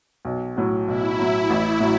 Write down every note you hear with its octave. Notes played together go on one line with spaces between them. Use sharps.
B1
A2 F#3
B1 E4
A2 F#3
A1
A2 F#3